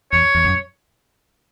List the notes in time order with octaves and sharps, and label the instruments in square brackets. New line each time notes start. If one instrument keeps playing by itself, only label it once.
[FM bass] E2 [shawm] C#5
[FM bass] E2
F#2